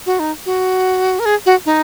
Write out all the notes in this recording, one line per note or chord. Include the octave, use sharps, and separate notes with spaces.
F#4
D#4
F#4
A#4
G#4
F#4
D#4